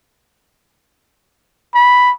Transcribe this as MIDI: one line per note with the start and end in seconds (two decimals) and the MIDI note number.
1.74 2.12 83